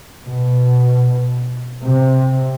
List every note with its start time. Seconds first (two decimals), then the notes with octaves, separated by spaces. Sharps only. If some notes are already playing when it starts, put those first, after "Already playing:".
0.24 B2
1.82 C3